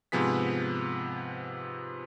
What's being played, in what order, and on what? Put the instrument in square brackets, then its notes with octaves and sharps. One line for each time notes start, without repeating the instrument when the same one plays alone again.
[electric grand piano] G#2 C3 F3 B3 G#4 B6